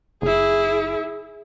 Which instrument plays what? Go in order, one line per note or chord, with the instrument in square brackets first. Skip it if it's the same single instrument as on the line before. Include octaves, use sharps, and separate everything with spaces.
[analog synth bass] F#1 [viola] E4 G#4